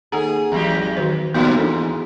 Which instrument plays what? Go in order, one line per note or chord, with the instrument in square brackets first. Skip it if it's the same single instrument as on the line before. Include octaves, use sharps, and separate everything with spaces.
[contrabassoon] D#2 [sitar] G#4 [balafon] A4 F#5 A#5
[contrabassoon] G#1 [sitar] E2 F#3 G4
[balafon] D#3 F#4 C5
[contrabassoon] D#2 [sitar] A2 F3 G3 [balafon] B3 F#4
[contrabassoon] E2 [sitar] G#2 [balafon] D4 A4